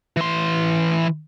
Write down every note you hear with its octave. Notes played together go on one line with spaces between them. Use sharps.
E3 C6